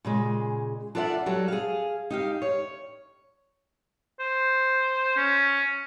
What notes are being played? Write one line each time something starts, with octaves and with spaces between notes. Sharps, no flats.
A#2 C#3 G#3
D4 F4 A4 D5 E5 F#5
F#3 G3 A4
G#4 F5
D#4 G4 F5
C#5
C5
C#4